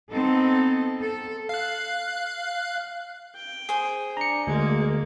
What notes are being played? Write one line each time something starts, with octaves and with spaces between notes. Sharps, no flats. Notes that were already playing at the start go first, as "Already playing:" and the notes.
B3 C4 D#4 A4
A4
F5 F#6
G5
G#4 C5
D4 A#5 C#7
D2 G#3 A#3